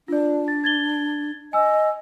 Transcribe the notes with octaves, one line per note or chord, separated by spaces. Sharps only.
D4 F4 D5
A6
G#6 A6 G7
D#5 G#5 E6